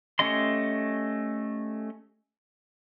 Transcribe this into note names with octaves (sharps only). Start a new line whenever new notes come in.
A3 C#4 G4 D#5 C6